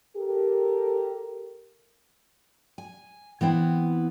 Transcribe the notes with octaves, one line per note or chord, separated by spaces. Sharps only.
G4 A4 A#4
G#5
E3 B3 C4 E4